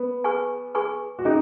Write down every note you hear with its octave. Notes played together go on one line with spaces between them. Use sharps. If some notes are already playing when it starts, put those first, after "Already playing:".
Already playing: B3
G#4 B4 G#5 C#6
G#4 B4 G#5 C#6
F#4
C#4 D#4 G#4